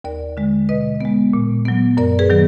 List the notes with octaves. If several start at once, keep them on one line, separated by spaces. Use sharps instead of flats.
D#2 A#4 D5
D3 G#3
B2 B4 D#5
G#3 B3
A#2
F#3 B3
F#2 A#4 D5
G#4 B4
D#3 F#3 B3